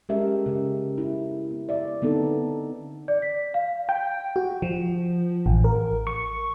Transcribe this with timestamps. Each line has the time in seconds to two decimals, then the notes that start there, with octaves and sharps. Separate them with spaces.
0.09 G#3 C#4 G4 A#4 E5
0.46 C#3
0.98 E4
1.51 B3
1.69 D5 E5
2.02 D3 B3 C4 D#4 A4
3.08 D5
3.22 B6
3.54 F5
3.89 G5
4.36 F#4
4.62 F3
5.46 A1
5.64 A#4
6.07 C#6